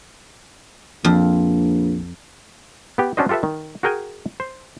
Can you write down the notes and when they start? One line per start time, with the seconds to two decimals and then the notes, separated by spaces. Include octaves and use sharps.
1.04 A#1 F2
2.98 B3 G4
3.17 C#4 D4 F#4 C5 D#5
3.29 F4 G4 A4 B4 E5
3.43 D#3
3.83 F#4 G#4 A#4 G5 G#5
4.40 C5